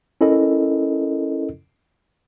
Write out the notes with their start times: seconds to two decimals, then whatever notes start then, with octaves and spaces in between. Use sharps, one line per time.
0.21 C#4 E4 A4 A#4 D#5